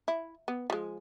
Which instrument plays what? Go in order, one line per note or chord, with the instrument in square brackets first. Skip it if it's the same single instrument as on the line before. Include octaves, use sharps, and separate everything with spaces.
[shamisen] E4
B3
F3 G#3